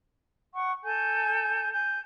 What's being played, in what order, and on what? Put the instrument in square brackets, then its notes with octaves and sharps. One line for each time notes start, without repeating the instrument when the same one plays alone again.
[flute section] F#5 C#6
A4 G#5 G6
G#5 G6